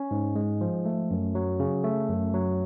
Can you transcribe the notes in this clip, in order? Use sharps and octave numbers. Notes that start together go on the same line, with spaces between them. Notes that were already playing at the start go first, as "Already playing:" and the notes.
Already playing: C#4
G#2
G#3
F3
A3
F#2
F#3
C#3
A3
F#2
F#3